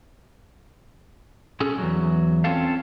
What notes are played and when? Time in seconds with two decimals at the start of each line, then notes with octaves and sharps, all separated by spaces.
1.60 C#4 G#4 A4
1.78 E2 G2 F#3
2.44 C4 C#4 F4 A4 F5